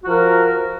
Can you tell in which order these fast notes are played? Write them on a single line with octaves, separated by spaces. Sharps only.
F#4 F3 A#4